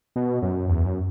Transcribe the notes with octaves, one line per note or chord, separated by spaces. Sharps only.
B2
F#2
E2
F#2